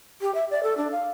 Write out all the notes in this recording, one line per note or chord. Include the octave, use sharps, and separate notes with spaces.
G4
E5
D5
A4
D4
F5